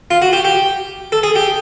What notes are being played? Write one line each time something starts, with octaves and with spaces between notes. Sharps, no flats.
F4
F#4
G4
G4
A4
G#4
G4